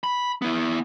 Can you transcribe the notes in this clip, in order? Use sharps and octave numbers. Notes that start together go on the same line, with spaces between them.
B5
B3 E4